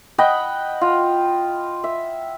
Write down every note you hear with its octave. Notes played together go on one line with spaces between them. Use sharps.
D#5 F#5 G5 B5
F4
E5